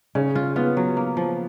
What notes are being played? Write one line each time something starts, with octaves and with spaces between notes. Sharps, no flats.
C#3 C#4
F4
B3 F4
F#3
A#3
F3